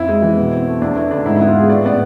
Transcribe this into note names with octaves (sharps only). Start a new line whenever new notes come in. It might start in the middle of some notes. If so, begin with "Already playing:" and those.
Already playing: F2 E4
G#3
E3
B2
C4
A3
E2 D4
A3 E4
D3 D4
G#2 E4
E4
B3
F4
G#3 G#4
A2 D5
B3 D5